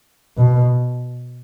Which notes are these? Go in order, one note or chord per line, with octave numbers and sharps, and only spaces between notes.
B2